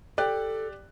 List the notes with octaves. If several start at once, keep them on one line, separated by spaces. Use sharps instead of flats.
G4 A4 D5 F#6